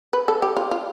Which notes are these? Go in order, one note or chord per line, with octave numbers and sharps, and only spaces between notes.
B4
A4
G4
F4
F4